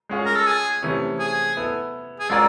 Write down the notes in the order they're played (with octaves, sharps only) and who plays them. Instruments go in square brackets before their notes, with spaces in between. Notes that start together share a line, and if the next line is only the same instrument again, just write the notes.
[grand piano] G#3 C#4 F4 G#4
[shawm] A#4
A4
G#4
[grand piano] C3 E3 A3 C#4
[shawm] G#4
[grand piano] B3 E4 A4
[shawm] G#4
[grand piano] G#3 C#4 F4 A#4 D5 [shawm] A4